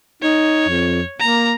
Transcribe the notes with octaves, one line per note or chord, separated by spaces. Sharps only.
D#4 C#5
F2
A#3 A#5